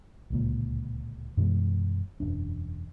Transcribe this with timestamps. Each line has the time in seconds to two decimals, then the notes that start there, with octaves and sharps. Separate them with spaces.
0.30 D1 C#2 A#2
1.37 F#2 B2 E3 G#3
2.20 E1 F#2 D4